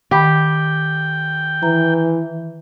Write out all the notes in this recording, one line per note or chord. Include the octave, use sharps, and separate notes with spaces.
D#3 G4 G5 B5
E3 A#5